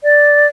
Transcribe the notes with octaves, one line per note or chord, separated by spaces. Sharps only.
D5